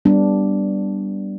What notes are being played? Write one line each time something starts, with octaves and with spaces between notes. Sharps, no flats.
G3 B3 D4